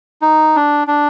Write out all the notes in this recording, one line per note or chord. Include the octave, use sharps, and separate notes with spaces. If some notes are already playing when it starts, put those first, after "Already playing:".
D#4
D4
D4